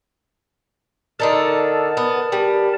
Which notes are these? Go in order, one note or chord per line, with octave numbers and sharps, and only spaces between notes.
D3 D#4 A4 A#4 D5 A5
B3
G3